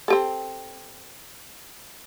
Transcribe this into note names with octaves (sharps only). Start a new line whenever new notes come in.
C4 G4 A4